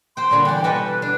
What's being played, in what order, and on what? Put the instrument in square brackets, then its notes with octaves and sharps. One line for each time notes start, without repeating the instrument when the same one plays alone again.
[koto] C5 G5 [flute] C6
[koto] A#2 D3 G3
[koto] E3 D5 [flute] G5
[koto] B2 G3 A4 [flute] B4
[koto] D4 [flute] B4